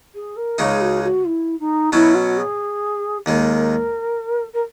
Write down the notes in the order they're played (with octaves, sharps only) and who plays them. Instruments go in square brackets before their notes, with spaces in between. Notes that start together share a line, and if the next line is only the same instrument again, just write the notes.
[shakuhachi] G#4
A#4
[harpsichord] C#2 C#3 G#3 D#4 [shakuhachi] G#4
[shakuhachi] F#4
F#4
E4
D#4
[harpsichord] B2 F#3 C#4 [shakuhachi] E4
[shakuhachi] F#4
G#4
[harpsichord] D#2 D#3 G#3 [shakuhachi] A#4
[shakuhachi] A#4